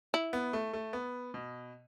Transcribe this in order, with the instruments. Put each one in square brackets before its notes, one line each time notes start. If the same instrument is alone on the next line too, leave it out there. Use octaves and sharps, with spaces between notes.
[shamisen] E4
[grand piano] B3
A3
A3
B3
B2